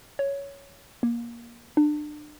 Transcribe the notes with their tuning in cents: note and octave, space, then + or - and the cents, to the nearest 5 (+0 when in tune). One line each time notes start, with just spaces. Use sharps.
C#5 +10
A#3 +20
D4 +30